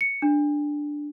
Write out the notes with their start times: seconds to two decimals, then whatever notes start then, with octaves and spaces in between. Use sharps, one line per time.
0.01 C#7
0.22 D4